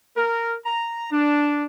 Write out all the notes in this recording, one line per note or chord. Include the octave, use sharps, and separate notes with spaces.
A#4
A#5
D4